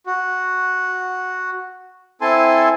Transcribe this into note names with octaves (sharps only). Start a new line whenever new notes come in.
F#4
C4 E4 A4 G#5 A5 C6